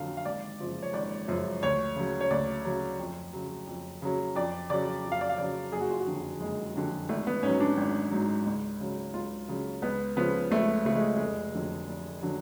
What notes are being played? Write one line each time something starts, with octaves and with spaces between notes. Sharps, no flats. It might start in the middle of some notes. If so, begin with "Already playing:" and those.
Already playing: F2 D3 F#3 F5
F5
G#1 D5
F#2 C#3 F3
C#5
G#1 D5
F#2 C#3 F3
D2 C#5
C#3 F#3
C#5
D2 D5
C#3 F#3
F2
C#3 F#3
F2
C#3 F#3
F2 D5
C#3 F#3 D5
F2
F5
D5
F5
C#3 F#3 D5
F#1 G#4
F#4
F4
F#4
F2 D3 F#3
F#1 G#3
F2 D3 F#3
G#1 A3
B3
G#2 F#3 C#4
D4
G#1
G#2 F#3
C#2
C#3 F#3
C#2 F4
C#3 F#3
C#2 B3
C#3 F3 B3
C#2 A3
C#3 F3 A3
G#3
F1 G#3
F2 D3 F#3
F1
D3 F#3